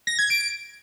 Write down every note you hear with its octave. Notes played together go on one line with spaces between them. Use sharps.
A#6
G#6
D7